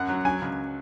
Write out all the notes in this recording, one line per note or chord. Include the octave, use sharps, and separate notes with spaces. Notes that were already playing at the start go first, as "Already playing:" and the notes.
Already playing: F#2 F#5
F#3
F#3 G#5
C#2